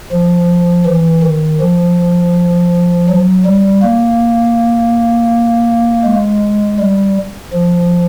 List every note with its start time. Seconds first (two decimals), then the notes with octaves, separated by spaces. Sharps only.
0.12 F3
0.86 E3
1.23 D#3
1.61 F3
3.09 F#3
3.45 G3
3.82 A#3
6.05 G#3
6.79 G3
7.53 F3